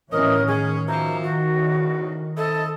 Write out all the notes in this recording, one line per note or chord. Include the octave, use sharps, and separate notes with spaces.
A2 E3 C#4 A#4 D#5
D#3 C#4 G#4
B2 E3 F3 A#5
F#4
E2 A2 C#3
C4 E4 A4 D#5